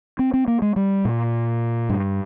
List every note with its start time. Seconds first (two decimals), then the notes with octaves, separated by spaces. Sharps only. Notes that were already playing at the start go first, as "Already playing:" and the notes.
0.19 C4
0.34 C4
0.48 A#3
0.62 G#3
0.76 G3
1.05 A#2
1.89 G2